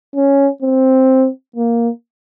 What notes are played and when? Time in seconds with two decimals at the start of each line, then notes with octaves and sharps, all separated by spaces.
0.15 C#4
0.63 C4
1.56 A#3